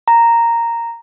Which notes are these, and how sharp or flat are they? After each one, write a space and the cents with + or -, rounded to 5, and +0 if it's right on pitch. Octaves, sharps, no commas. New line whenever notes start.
A#5 -5